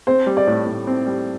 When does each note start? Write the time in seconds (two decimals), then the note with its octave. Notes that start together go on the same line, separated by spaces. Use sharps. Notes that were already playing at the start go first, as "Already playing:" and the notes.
0.07 C4 C5
0.26 G3
0.37 D5
0.47 A2
0.67 A2
0.87 C4
1.06 G3